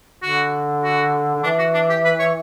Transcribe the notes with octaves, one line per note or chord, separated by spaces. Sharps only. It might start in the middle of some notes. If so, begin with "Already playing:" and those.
D3 F#4
F#4
D3
E3 D4
F#4
D4
G4
B4
C#5